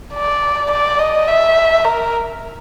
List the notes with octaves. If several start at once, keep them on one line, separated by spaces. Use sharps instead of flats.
D5
D5
D#5
E5
A#4